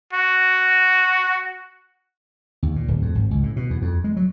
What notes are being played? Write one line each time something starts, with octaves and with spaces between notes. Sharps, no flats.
F#4
D#2
A#2
D1
F2
G#1
C#2
A2
B2
E2
F2
G#3
F#3